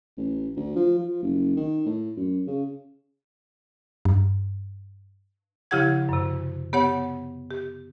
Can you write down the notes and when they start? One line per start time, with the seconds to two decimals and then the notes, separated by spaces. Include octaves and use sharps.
0.17 A1
0.56 D2
0.76 F3
0.99 F3
1.22 F#1
1.57 D#3
1.86 A2
2.16 F#2
2.47 C#3
4.05 G2
5.71 C#3 F3 E4 G4 F#5 G#6
6.09 F#2 C3
6.73 B3 G4 C#5 F#5
7.51 G4